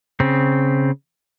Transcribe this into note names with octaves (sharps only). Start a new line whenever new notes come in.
C#3 C4